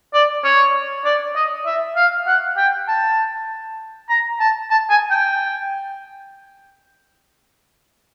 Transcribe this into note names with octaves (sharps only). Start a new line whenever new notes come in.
D5
C#5
D5
D#5
E5
F5
F#5
G5
A5
A#5
A5
A5
G#5
G5